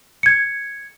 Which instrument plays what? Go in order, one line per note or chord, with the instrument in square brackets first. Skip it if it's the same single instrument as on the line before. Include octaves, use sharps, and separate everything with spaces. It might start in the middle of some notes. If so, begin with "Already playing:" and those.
[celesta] G#6 C#7